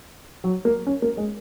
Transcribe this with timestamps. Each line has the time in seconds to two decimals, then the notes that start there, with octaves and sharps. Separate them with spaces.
0.44 F#3
0.65 A#3
0.87 C#4
1.02 A#3
1.17 G#3